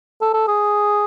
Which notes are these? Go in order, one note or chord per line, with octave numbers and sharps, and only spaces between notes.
A4
A4
G#4